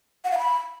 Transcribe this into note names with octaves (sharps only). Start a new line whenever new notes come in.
F#5
F5
B5